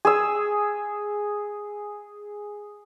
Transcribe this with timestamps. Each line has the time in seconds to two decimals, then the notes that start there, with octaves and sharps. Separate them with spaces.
0.05 G#4 E6